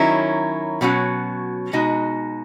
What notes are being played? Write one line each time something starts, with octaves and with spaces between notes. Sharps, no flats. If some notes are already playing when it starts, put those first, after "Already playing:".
Already playing: D#3 F#3 C#4 E4
B2 F#3 C#4 F#4
B2 G#3 D#4 F#4